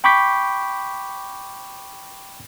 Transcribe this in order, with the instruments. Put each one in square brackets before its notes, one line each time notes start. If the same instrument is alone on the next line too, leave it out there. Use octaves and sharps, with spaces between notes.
[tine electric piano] G5 B5 C#6 D6 G6 B6